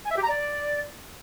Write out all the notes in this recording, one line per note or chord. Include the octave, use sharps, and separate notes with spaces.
G#5
E5
G4
A#5
D5